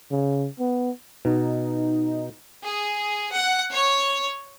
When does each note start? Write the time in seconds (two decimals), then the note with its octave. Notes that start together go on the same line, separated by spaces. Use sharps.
0.11 C#3
0.60 B3
1.25 B2 D#4
2.62 G#4
3.33 F#5
3.72 C#5